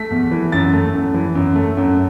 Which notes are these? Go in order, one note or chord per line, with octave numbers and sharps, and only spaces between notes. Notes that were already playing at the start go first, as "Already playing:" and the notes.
Already playing: A3 B6
E2
E3
F#2 A6
A3
F#2
E3
F#2
A3
F#2